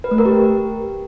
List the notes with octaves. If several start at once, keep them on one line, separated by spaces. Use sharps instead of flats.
B4
A3
A#4
G4